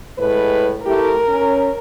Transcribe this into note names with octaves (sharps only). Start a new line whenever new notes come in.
A2 G#3 B4
A3 E4 G4 A#4
C#4